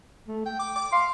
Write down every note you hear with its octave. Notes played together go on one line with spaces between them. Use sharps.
A3
G5
D6
D6
F5 C6